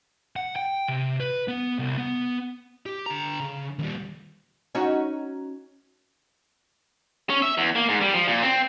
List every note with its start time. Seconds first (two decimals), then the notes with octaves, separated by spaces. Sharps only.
0.36 F#5
0.56 G5
0.88 C3
1.20 B4
1.48 B3
1.79 C2
1.97 B3
2.86 G4
3.06 D3 A#5
3.40 C#3
3.79 D#2 G3
4.75 C#4 D#4 F#4
7.30 C#4
7.42 E5
7.58 E2
7.76 A#3
7.89 G#2
8.01 G3
8.14 F3
8.28 A#2
8.43 C4